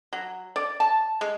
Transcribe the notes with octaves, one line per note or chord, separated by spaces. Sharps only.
F#3
D5
A5
G#3